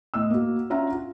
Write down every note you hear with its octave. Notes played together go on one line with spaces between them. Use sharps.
A2 D#5 E6
A#3 F#4
C#4 D4 F4 E5 F#5 A#5
F4